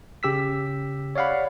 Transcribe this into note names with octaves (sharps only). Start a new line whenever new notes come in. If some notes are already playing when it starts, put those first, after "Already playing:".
C#3 G4 E6 B6
C#5 D5 F5 F#5 B5